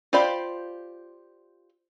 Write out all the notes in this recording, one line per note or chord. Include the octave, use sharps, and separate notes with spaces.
F4 G4 C5 D5 B5